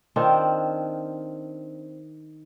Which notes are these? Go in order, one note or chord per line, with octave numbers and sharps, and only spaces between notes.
D#3 C4 D4 F4